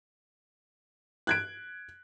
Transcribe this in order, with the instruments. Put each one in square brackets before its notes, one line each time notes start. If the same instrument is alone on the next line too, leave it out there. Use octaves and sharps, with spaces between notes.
[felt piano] F#6 G#6 D7